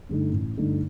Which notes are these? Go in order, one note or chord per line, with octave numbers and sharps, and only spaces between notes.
G2 D3 A3 D#4
A1
G2 D3 A3 D#4